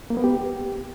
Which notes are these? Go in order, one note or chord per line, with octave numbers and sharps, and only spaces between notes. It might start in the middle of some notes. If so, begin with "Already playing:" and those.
A#3
B3
G4